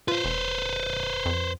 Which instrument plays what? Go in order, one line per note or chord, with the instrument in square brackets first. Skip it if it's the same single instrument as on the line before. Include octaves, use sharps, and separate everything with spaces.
[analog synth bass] F4 [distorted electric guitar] B4 C5
[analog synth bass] E1
F2